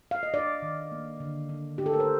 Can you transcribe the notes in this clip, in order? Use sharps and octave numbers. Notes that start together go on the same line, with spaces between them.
F5
D#5
D4 D5
D#3
A#3
D3
D4
D4 G4
A4
A#4
C5